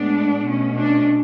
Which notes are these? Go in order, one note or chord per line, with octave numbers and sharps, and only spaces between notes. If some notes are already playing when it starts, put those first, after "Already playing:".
Already playing: A2 G#3 B3 D4
B2 A3 C#4
D4